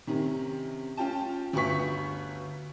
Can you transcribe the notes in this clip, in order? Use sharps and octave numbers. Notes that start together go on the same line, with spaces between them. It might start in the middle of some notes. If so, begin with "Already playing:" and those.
C3 D#3 C#4
C#4 F4 G5 A5
G1 D2 F#4 B4 C#6 B6